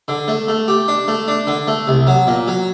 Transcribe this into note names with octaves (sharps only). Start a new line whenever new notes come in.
D3
A3
A3
G4
D4
A3
D4
D3
A3
C2
F#3
A#2
F#3